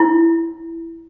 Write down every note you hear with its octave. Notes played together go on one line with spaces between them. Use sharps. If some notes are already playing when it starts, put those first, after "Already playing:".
Already playing: E4